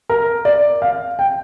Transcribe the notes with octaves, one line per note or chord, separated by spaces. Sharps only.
A#4
D5
F5
G5